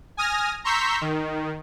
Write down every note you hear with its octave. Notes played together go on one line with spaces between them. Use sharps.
G#5 D#6 F6 A#6
A#5 C6 C#6 E6 G6 B6
D#3